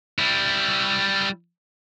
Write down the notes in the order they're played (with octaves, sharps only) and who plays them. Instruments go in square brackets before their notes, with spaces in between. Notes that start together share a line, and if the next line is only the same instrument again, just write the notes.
[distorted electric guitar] G3 E4